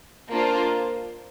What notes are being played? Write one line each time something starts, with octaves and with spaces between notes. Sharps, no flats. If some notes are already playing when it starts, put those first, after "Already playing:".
A#3 D4 F4 C5